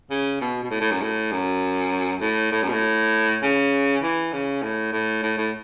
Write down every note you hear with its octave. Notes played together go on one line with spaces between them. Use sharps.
C#3
B2
B2
A2
A2
F#2
A2
F#2
A2
A2
F#2
B2
A2
C#3
E3
C#3
A2
A2
A2
A2